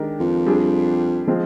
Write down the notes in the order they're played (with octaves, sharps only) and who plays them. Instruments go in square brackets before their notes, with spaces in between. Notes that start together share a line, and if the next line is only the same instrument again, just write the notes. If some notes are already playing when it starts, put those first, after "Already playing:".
Already playing: [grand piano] D#3 G#3 D4 G4 A#4
[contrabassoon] F2
[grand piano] G3 D4 G#4
F3 G#3 C4 F4